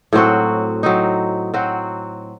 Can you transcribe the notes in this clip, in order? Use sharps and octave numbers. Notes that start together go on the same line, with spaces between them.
A2 F#3 C4 F#4
F#3 C4 D#4
F#3 C4 F#4